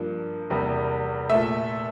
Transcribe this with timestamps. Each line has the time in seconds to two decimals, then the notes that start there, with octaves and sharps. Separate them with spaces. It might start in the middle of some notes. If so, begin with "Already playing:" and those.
Already playing: G2 F3 A#3
0.50 E2 C3 G3 A#3
1.30 A3 E5
1.35 A#2